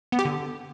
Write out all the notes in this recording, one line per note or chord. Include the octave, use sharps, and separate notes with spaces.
B3
G4
D3